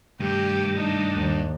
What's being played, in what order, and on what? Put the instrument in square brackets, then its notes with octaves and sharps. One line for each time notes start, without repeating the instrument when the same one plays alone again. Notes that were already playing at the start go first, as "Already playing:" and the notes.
[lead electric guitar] G2 [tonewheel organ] C3 D#3 A3 [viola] G4
[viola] D4 D#4
[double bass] D#2